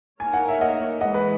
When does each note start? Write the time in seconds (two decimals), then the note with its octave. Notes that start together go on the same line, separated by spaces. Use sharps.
0.20 A#3 D#4 A#4 C#5 G#5
0.33 F#5
0.48 E5
0.61 D#5 F#5
1.01 E3 G#3 B3 D#5 F#5
1.14 B4